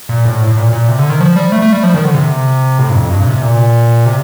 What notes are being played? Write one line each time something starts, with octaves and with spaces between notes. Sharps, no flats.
A#2
A2
A2
A#2
A#2
C3
D3
D#3
F3
G3
A3
A3
G3
F3
D#3
D3
C3
A2
G2
F2
G2
A#2
C3
A#2
C3